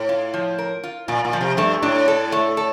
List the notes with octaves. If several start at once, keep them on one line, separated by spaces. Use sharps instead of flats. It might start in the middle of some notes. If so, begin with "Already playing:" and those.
Already playing: A2
F4
F3
A#4
F4
A#2 F4
A#2
F3
C3
G2 A3
A2 D4
A4
A3
A4